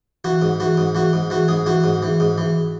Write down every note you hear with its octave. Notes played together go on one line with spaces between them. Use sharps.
E3 F#4
G#2
E3 F#4
G#2
E3 F#4
G#2
E3 F#4
G#2 G#4
E3 F#4
G#2
E3
G#2
E3